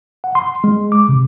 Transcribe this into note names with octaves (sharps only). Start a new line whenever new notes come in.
F#5
C6
G#3
D6
C3